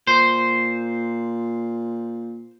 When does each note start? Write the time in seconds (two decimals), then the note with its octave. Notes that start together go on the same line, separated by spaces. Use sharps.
0.07 A#2 C5